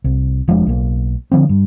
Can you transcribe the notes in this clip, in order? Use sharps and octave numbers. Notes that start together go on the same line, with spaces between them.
C2
F1 F3 G#3 D4
B1 A#3
D3 F3 C4
G2